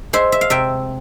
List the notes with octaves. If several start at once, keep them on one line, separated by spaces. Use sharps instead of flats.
G#3 C5 E5
E5
F5
C3 E5 G5